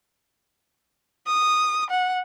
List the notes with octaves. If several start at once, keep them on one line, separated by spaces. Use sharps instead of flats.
D#6
F#5